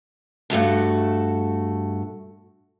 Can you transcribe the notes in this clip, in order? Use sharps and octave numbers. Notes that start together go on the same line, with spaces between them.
G2 A3 F#4 A4